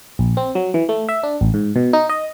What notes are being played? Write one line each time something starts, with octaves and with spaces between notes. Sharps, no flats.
A#1
C4
F#3
E3
A3
E5
D4
A1
G#2
B2
D#4
D#5